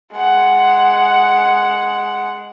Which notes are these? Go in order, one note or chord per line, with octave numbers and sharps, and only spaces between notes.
G#3 F#5